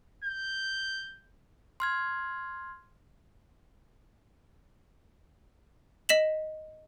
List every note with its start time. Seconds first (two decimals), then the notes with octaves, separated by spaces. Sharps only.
0.24 G6
1.80 C6 F6 G#6
6.09 D#5 B6 E7 F#7